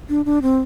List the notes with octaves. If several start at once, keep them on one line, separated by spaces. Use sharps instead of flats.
D4
D4
C4